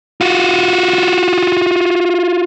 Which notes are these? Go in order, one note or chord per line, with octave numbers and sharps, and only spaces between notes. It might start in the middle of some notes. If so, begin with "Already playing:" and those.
F4 F#4